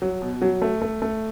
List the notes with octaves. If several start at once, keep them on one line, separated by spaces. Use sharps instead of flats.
F#3
B2
F#3
A3
A3
A3